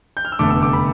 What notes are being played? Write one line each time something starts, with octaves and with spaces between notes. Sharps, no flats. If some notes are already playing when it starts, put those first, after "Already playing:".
G6
F6
E6
F1 E2 D3 A3 D6
E6
D6
B5